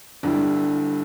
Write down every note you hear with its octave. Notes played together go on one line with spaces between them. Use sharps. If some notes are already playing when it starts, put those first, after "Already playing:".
G1 G2 G3 E4